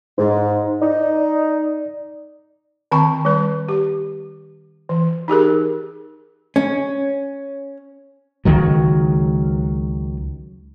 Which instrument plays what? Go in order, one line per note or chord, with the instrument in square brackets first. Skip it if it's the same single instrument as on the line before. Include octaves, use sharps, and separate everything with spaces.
[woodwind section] G#2 [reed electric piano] D#4 C5
[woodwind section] D#4 [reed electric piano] D5
[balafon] D#3 C4 A5 B5 C#6
G3 B4
G4
E3
D#4 G4 G#4 A#4
[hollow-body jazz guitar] C#4
[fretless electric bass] C#2 D#3 F#3